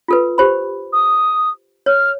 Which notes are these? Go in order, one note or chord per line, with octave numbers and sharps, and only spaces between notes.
F4 A4 B4
G4 C5 B5
D#6
C#5 F6